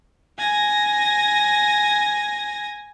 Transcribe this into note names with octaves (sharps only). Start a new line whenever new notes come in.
G#5 A#6